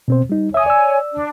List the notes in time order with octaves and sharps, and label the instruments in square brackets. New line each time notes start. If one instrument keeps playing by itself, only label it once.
[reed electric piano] B2 C4 C5
G3 D#4
[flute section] C#5 G#5 [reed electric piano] E5 D#6
[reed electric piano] D5 E6
[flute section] D4